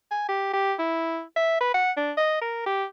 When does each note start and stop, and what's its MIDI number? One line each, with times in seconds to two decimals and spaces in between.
0.11 0.29 80
0.29 0.49 67
0.53 0.74 67
0.79 1.22 64
1.36 1.58 76
1.61 1.73 71
1.74 1.91 78
1.97 2.12 62
2.17 2.39 75
2.42 2.62 70
2.66 2.85 67